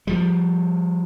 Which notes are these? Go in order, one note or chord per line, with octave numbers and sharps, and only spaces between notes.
F3 G3